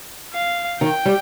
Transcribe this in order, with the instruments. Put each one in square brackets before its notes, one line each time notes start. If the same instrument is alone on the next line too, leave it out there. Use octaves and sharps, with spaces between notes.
[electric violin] F5
[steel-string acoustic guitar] D#3 [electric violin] G5
[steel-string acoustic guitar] G3